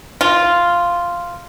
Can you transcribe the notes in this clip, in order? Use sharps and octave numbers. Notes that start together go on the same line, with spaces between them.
F4